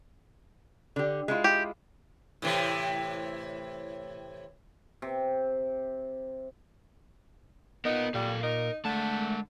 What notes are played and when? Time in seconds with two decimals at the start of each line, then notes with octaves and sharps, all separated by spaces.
0.96 D3 G4
1.28 G#3 E4 F4
1.44 G4
2.42 A2 C3 E3
5.02 C3
7.85 B3 D#4 F4 A#4
8.14 A#2 G3 A4 F5
8.43 D#4 A#4
8.85 D3 G#3 A3 A5